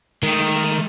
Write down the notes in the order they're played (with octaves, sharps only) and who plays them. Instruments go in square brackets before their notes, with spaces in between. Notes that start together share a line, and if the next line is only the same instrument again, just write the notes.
[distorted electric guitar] D#3 [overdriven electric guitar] G#3 A3